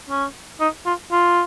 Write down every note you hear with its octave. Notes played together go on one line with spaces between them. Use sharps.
C#4
D#4
F4
F4